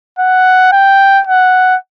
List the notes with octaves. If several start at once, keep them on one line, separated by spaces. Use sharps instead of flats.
F#5
G5
F#5